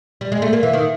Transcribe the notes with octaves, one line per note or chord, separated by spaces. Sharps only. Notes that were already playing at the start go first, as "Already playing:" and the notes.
G3
G#3
A3
A#3
E3
D#3